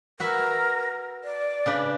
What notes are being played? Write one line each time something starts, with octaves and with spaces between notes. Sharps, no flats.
F#4 A#4 B4 E5
D5
C#3 D4 B4